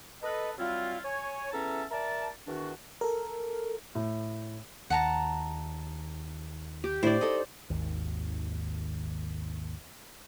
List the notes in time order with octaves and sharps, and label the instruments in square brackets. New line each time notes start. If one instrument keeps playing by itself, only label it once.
[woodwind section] A4 B4 D#5
F#3 G3 C4 E4 F4
C#5 G#5
E2 C#4 A4 E5 A5 A#5
A#4 D5 E5 A5
E2 D#3 D4 F#4
[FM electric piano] A4 A#4
[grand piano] A2
[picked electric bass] D#2 [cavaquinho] F#5 A5 A#5
[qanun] G4
[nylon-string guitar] A2 D4 E4 [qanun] C5 D5
[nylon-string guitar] D#4 A4 [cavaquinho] D#5
[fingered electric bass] G#1 D#2